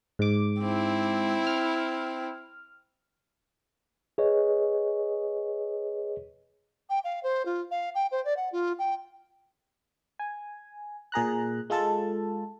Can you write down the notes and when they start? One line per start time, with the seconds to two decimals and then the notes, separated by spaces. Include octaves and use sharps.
0.19 G#2 D6
0.61 C4 E4
1.47 F6
4.18 G#4 B4 C#5 D#5
6.90 G5
7.04 F5
7.23 C5
7.45 F4
7.71 F5
7.95 G5
8.11 C5
8.25 D5
8.37 F#5
8.52 F4
8.79 G5
10.19 G#5
11.12 A#2 G#4 A#5 F#6
11.70 G#3 F4 A4 A5